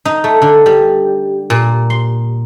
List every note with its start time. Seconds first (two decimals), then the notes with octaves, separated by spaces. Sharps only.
0.05 D#4
0.24 A3
0.42 D3
0.66 G3
1.50 A#2
1.90 C6